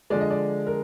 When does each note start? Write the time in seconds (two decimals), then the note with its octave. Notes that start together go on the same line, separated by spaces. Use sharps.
0.10 D3 F3 G#3 D5
0.21 D#5
0.30 D5
0.67 A#4